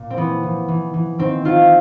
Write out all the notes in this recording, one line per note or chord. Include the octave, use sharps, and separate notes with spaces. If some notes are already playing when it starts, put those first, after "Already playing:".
Already playing: A#2
C4
E3 B3
E3
E3
E3
D#3 C4
D#3 F4